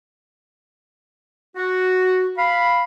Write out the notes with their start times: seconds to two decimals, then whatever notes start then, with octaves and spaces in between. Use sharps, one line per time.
1.56 F#4
2.38 F5 B5